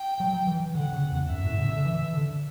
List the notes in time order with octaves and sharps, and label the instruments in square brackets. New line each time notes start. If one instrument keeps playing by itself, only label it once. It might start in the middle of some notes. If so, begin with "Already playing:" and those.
Already playing: [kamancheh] G5
[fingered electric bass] F#3
E3
[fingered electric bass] D3 [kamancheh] F#5
[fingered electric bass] C#3
E2
[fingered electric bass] F#2 [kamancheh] E5
[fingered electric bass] A2
C#3
D3
E3
D3